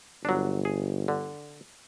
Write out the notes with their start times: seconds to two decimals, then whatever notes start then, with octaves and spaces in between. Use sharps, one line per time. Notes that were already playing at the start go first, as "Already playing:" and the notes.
0.25 G1 F#3 D4
0.65 G#4
1.08 D3